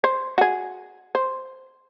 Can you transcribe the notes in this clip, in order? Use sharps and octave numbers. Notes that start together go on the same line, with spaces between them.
C5
F#4 G#4
C5